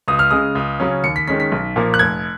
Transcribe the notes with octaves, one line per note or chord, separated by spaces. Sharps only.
C#2 D#6
F6
C#3 G#3 D#6
C#2
C#3 F#3 C#4
D#2 C#7
B6
D#3 G#3 C#4 B6
B6
B1
A#2 F3 A#3
F#6
F1 G#6